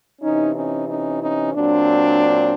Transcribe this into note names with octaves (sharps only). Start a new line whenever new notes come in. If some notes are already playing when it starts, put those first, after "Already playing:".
C3 E3 C#4 D#4
C#4 D#4
C#4 D#4
C#4 D#4
A#2 F#3 C4 D4